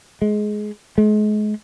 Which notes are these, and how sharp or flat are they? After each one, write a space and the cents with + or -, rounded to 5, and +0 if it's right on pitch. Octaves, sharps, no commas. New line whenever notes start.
G#3 +15
G#3 +35